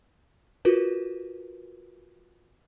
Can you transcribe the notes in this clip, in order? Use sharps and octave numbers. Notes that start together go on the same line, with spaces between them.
F4 F#4 A#4 B4